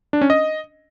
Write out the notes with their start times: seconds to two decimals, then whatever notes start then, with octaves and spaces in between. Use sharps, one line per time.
0.13 D4
0.21 C#4
0.30 D#5